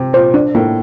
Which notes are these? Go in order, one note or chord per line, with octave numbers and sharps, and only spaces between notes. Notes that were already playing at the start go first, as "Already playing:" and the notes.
Already playing: C3
A#2 C5
D4
A2 A#3